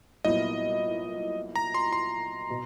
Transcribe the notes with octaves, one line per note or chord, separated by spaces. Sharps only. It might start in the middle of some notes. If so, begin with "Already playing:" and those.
C2 A#2 F#3 B3 E4 D#5
A#5
C6
C6
B2